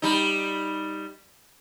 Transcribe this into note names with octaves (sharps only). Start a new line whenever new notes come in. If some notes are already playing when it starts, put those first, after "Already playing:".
G3 D#4